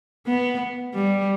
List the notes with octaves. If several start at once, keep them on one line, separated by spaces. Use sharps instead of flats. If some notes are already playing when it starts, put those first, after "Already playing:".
B3
G3